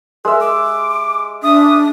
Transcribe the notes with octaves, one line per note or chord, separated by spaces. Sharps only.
G#3 A#4 E5
D6
D4 E5 D#6